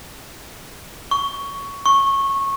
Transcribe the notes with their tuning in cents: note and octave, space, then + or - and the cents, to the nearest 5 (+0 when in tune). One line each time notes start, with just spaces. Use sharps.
C#6 +10
C#6 -15